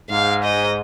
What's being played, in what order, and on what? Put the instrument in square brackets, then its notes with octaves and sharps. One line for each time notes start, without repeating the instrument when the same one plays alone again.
[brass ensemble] G#2 [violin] F5
[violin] D#5